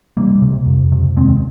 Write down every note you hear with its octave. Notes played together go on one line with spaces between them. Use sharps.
C3 G3 A#3
C3
F2
C3
D#2 G#3 C4